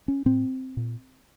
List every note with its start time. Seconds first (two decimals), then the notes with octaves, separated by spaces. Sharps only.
0.08 C#4
0.26 A2 C4
0.77 A#2